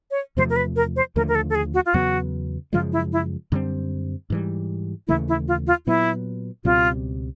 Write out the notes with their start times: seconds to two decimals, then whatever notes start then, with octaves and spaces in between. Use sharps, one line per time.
0.11 C#5
0.37 E2 C3 F3 A3 C5
0.50 A#4
0.56 B4
0.76 A#4
0.96 C5
1.16 D#2 D3 F3 A3 A#4
1.28 A#4
1.35 A4
1.50 A4
1.55 G#4
1.74 F#4
1.86 F4
1.94 E2 C#3 F#3 B3 F#4
2.73 F#2 C#3 F3 G#3 F4
2.92 E4
3.12 E4
3.52 F#2 D3 G3 C4
4.30 G#2 E3 G3
5.08 D#2 C#3 E3 A3 E4
5.28 E4
5.48 F4
5.67 F4
5.87 A#2 F#3 B3 E4
6.65 C#2 B2 G3 C4 F4